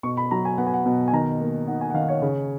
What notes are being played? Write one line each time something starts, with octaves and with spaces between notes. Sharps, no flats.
B2 C#6
B5
F#3 A#5
G#5
B3 F#5
G#5
F#5
B2
G#5
D#3 A#5
A#3
D#4 F#5
G#5
F#5
D#3 F5
C#5
C#3